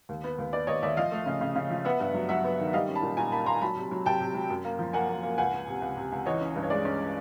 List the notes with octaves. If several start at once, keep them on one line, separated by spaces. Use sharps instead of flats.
D#2
B3
D#2
B3 D5
D#2 C#5 D#5
D#2 D5 E5
F3 D#5 F5
A3
C#3
C#3
C#3
F3
B3 E5 F#5
G2
F#3
F#3 E5 F#5
B3
D#3
G3 D#5 F5
C#4
A5 B5
A#2
A#2 G#5 A#5
A#3 A5 B5
A#3 A#5 C6
F#3 A5 B5
C3
F#3
C3 G5 A5
C3
F#3
F#2
A#3
F3
A#3 F#5 G#5
A#3
A#3
C#2 F#5 G#5
C#2
C3
C#2
C3
C#2
E3 C#5 D#5
C#4
G2
C#5
G#3 D5
C#4